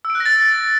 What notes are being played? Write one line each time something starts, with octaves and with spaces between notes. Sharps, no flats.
E6
D7
F#6
A#6
A6